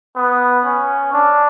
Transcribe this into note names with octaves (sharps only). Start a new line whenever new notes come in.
B3
C#4
D4